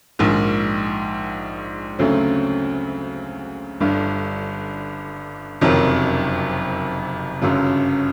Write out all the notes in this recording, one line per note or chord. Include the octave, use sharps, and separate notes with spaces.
A#1 G#2 D#3
D2 C#3 F#3 A3 C4
G1 G2 D3
F#1 F2 C3 D#3 F#3
G1 F#2 C#3 F#3